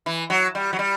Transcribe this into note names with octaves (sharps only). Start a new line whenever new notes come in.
E3
F#3
G3
F#3
G3